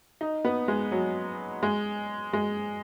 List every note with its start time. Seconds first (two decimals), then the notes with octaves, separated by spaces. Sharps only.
0.21 D#4
0.45 B3
0.68 G#3
0.92 F#3
1.63 G#3
2.33 G#3